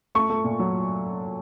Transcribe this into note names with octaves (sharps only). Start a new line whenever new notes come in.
A3 C#6
A3
A#2
F#3